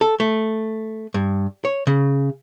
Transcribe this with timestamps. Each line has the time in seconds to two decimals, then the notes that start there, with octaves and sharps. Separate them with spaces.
0.01 A4
0.20 A3
1.14 G2
1.65 C#5
1.87 C#3